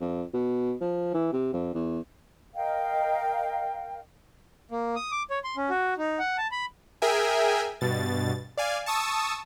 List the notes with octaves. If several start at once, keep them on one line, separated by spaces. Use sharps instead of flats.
F2
B2
F3
E3
C3
F2
E2
A#4 D#5 F5 G5
A#3
D#6
D6
C#5
C6
C#4
F#4
D#4
F#5
A5
B5
G#4 A#4 E5 G5 G#5
G2 B2 A6
D5 F5 G#5
A5 C#6 D#6 E6